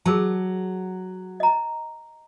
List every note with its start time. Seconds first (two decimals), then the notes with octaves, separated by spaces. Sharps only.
0.06 F#3 G#4 A#4 A5
1.40 D#5 A#5